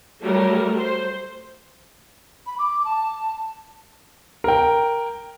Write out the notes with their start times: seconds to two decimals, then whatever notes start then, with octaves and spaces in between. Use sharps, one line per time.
0.21 F#3 G3 A3 A4 A#4
0.76 C5
2.46 B5
2.59 D6
2.85 A5
4.44 A#4 G5